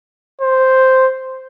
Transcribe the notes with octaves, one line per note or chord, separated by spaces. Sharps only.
C5